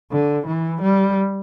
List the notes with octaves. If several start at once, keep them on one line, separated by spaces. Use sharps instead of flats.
D3
E3
G3